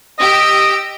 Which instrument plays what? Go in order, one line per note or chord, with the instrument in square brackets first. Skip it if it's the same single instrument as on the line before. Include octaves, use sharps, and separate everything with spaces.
[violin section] G4 E6 D7 [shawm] D#5